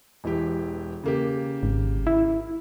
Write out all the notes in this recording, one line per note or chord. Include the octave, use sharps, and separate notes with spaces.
E1 E3 G4
C#3 A#3 G4
G#1
E4